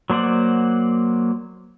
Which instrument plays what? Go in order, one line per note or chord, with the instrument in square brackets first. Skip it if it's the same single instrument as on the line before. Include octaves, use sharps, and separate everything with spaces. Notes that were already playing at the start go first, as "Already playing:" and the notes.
[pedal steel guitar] F#3 A#3 C5 D5 F#5